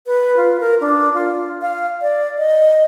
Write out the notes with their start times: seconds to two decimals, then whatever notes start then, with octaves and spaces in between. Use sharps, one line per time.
0.07 B4
0.37 F4
0.60 A#4
0.81 D4
1.14 F4
1.62 F5
2.02 D5
2.38 D#5